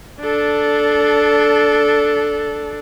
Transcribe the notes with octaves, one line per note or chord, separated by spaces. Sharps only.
D4 A4